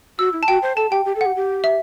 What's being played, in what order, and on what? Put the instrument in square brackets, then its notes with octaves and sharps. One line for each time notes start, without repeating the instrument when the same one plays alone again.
[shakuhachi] F#4 [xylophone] E6
[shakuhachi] E4
[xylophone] A5
[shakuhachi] F#4 [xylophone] G5
[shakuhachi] C5
[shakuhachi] A4 [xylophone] A5
[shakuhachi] G4 [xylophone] G5
[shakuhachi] G4
A4
[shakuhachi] G4 [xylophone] F#5
[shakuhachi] G4
[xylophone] E5